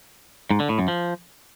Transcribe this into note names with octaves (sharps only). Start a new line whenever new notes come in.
G#2
D3
A2
F#2
F3